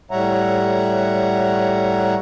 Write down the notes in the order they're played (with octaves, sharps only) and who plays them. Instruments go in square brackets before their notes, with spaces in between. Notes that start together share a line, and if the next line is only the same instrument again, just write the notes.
[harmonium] A2 G3 C#5 E5 F#5 A#5